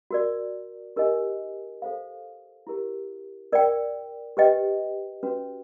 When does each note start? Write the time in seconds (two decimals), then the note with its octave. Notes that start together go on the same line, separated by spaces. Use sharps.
0.11 F#4 A#4 D5
0.96 D#4 G4 A#4 D#5 G#5
1.82 A4 C5 F5
2.67 E4 G4 A#4
3.52 A#4 D5 G5
4.37 G4 B4 D#5 G5
5.23 C#4 F#4 B4